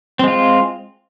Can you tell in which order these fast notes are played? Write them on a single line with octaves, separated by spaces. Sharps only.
C4 G#3 F4